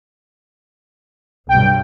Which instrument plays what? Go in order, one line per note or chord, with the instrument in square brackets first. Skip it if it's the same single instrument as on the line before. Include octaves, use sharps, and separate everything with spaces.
[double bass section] B1 G2 [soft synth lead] G5